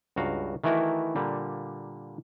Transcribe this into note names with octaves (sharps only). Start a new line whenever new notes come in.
C#2 G2 F#4 F5 A#5
D#3 E3 A3 E4 F#4 A#4
A#2 D3 G3 A#3